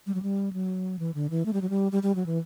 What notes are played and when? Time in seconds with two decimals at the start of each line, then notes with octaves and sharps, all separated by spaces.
0.07 G3
0.14 F#3
0.22 G3
0.53 F#3
0.99 E3
1.14 D3
1.30 E3
1.46 A3
1.53 G3
1.62 F#3
1.70 G3
1.92 G3
2.03 G3
2.15 F#3
2.26 E3